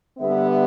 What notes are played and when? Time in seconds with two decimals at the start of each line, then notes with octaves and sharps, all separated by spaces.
0.19 D3 G3 B3 E5
0.51 E5